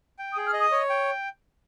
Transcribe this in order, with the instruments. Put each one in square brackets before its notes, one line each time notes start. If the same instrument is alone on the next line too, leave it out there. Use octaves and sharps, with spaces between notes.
[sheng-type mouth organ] G5
[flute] D#6
[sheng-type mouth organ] G#4
[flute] F6
[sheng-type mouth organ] D#5 [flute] D#6
[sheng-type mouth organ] C#5
G5